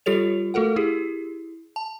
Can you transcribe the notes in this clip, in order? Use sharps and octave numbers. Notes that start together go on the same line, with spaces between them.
G3 F4 G4 A4 C#5 F7
A3 F#4 A4 A#4 F#5
E4 G4 G#4
A5